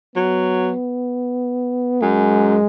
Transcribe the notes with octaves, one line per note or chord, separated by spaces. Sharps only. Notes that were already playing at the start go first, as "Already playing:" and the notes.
F#3 B3
F#2 G#3